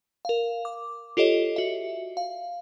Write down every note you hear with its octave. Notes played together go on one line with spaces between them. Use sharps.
A#4 F5
D6
F4 G4 A4 C#5 D#5
F#4 E5
F5